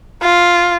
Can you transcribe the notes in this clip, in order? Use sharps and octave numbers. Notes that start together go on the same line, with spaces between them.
F4